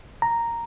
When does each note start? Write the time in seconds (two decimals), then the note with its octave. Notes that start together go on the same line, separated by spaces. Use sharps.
0.22 A#5